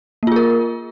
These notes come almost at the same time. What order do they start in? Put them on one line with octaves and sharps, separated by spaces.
A#3 F4 G#4 A#4